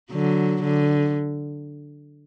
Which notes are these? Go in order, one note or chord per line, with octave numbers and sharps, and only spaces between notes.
D3 F#3
D3